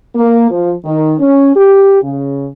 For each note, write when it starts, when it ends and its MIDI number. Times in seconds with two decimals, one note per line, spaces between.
0.15 0.50 58
0.51 0.72 53
0.85 1.14 51
1.20 1.51 61
1.56 1.98 67
2.03 2.48 49